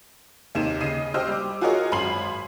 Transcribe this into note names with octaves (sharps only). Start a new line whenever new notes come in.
D#2 C3 A#3 D#4 E7
C#3 D#5 C7 D#7
G4 C5 D#5 G5 E6 F6
G3 D6
F4 F#4 G#4 A#4 C#5 D#5
G#1 F#2 B5 C6 C7 F#7